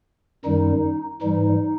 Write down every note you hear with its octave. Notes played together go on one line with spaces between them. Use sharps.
F#2 D#3 G3 D#4
G#2 E3 G3 D#4